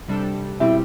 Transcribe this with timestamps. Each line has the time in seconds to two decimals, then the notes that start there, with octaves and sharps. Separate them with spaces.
0.08 C3 G3 D4 A4
0.60 B2 G3 C4 E4 G4